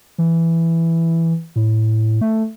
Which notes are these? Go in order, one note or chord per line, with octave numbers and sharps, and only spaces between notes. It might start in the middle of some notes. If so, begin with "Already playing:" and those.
E3
A2
A3